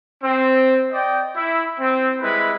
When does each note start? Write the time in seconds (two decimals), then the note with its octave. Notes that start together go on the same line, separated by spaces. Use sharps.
0.24 C4
0.91 D5 D#5 G5
1.36 E4
1.80 C4
2.22 G3 G#3 E4 B4